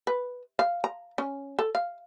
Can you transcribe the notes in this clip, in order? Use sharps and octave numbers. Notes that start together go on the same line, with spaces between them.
B4
F5
A#5
C#4
A4
F5